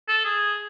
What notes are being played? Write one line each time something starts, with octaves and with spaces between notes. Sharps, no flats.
A4
G#4